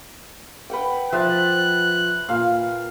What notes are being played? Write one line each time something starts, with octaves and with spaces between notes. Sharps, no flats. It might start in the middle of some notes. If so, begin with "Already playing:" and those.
B4 F#5 G5
F3 E5 A5 F#6
A#2 F5